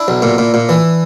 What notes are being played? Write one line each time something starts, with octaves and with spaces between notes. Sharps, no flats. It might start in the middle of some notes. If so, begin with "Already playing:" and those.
Already playing: D4 E4
B1
A#2
A#2
A#2
E3